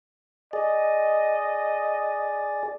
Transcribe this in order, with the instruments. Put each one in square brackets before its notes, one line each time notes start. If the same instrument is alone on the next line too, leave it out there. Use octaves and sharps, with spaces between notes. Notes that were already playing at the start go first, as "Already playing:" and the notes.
[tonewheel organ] G#4 D5 [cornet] D#5